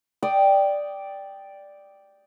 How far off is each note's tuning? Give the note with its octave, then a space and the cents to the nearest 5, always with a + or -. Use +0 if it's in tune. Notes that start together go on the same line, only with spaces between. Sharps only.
D5 +0 G5 +0 D#6 +0